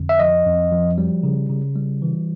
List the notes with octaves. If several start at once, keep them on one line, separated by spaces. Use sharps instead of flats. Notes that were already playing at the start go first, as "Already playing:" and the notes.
Already playing: F2 D3
E5
F3 D#5
F2
F3
G3
C#3
C#3
G3
E3